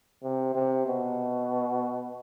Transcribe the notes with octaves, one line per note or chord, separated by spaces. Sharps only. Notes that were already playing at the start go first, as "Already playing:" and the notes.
C3
C3
B2